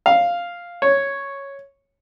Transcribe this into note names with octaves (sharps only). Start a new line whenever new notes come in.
F5
C#5